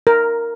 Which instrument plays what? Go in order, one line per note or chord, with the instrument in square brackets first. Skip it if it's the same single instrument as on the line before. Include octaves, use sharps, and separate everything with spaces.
[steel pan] A#4